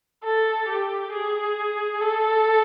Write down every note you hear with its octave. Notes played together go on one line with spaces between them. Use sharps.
A4
G4
G#4
A4